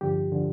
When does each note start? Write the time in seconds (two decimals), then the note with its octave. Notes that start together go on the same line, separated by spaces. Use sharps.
0.01 G2 D3 F3 G4
0.32 D3 F3